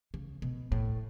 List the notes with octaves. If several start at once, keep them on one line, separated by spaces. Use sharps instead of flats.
C#3
B2
A2